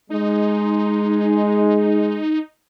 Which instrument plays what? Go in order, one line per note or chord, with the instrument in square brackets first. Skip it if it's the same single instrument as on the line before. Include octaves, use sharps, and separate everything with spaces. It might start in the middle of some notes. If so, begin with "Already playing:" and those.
[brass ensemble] G#3 [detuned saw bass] D#4